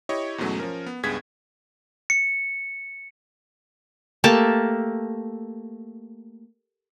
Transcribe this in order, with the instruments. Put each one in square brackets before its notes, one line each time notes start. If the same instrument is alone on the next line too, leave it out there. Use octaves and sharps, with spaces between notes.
[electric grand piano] E4 G4 C#5 D#5 C#6
E2 G#2 B2 F#3 A3 C#4
F3 C#4 A#4
B3
C#2 G2 B3 G#4 G#6 B6
[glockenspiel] C#7
[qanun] A3 A#3 G4 A5